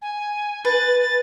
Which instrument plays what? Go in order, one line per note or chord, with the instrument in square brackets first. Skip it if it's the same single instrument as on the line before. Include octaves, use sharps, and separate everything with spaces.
[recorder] G#5
[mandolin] B4 [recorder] A6
[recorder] A6